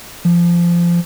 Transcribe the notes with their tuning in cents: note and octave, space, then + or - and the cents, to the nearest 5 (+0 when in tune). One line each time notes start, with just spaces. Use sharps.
F3 -20